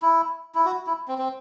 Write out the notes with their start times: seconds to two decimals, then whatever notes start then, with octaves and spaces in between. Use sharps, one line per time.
0.02 E4
0.55 E4
0.65 F#4
0.87 E4
1.08 C4
1.18 C4